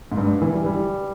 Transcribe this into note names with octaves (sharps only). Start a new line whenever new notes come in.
G#2
G2
E3
G3
G3